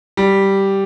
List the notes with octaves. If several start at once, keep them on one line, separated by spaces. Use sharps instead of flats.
G3